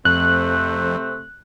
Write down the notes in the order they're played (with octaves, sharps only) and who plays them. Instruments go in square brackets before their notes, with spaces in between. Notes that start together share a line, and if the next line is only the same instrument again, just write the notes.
[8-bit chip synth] F2 [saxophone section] C3 A3 C4 [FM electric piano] F#6